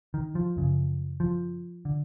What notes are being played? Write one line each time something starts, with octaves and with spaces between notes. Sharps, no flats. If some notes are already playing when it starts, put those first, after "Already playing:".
D#3
F3
F#2 C#3
F3
D3